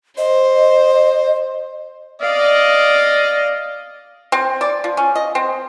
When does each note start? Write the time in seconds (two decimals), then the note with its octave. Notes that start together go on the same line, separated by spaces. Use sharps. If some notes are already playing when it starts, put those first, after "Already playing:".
0.18 C5 D#5
2.22 D5 D#5 F5
4.32 C4
4.61 D5
4.84 F3
4.97 C#4
5.15 D#5
5.35 C4